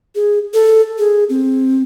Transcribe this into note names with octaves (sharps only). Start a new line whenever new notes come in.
G#4
A4
G#4
C4